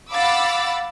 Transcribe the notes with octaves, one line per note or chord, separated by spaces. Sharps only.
F5 F#5 B5 D6 E6 A6